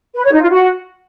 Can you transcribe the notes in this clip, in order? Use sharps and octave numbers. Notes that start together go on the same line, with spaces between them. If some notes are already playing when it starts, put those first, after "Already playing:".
B4
C#5
D#4
F4
F#4